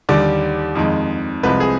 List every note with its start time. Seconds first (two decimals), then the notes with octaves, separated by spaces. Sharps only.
0.09 D#2 D3 G3 D5
0.75 F2 D#3 G#3
1.43 C2 C3 F3 G#3 B4
1.60 G#4